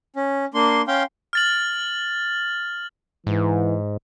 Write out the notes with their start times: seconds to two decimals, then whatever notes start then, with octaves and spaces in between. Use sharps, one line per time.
0.16 C#4
0.54 A#3 D4 C6
0.88 C#4 F5 G5 C6
1.33 F6 A6 F#7
3.27 G#2 E3